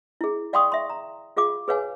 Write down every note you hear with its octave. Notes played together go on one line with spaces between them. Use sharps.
E4 G#4
D5 F5 G5 C6 C#6 D#6
E5 C6
A#5
F4 G#4 F5 D6
G#4 B4 C#5 F5 G#5